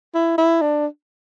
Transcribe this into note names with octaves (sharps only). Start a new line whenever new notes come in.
E4
E4
D4